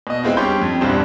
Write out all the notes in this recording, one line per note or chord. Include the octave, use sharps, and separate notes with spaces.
B2 D#5
G#3 B3 C4 E4 F4
G3 C#4 D4 G5 C6 G6
F2
A#1 E2 G2 G3 D4 C5